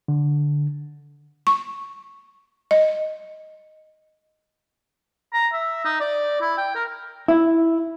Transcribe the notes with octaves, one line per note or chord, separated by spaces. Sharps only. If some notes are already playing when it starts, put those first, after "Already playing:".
D3
C#6
D#5
A#5
E5
D#4
D5
E4
G5
A#4
E4